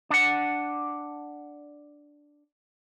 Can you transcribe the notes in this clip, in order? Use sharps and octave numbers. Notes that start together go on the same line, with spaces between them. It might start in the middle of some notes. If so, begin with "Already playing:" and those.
D4 F#5